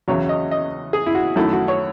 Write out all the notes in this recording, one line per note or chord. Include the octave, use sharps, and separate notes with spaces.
E2 C#3 F#3 C#5
D#5
D#5
G#4
E4
F#4
F#2 D#3 F#3 A3 E4
F#4
C#5